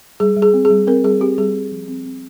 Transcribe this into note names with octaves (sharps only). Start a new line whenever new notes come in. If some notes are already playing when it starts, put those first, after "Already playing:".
G3 G#4
G3
G#4
C4
G#4
G3
C4 A#4
G3 G#4
C4 G4
G3 G#4
C4
F3
C4
C4